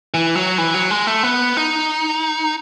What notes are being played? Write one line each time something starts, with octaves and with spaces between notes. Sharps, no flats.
E3
F#3
E3
F#3
G#3
A3
B3
D#4